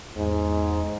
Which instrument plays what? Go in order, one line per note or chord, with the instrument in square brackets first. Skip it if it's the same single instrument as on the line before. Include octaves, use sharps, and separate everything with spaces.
[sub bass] E2 [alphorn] G#2